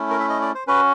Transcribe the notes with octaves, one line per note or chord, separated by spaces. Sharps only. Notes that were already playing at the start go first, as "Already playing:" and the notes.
Already playing: A3 C#4 E4
A#4
E5
D#5
D5
C5
C#4 F#4 B4